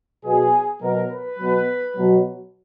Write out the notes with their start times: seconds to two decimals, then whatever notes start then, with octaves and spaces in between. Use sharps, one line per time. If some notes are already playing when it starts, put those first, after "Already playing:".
0.24 B2 F#3 G#4
0.82 B2 F#3 A#4
1.11 B4
1.39 B2 F#3
1.97 B2 F#3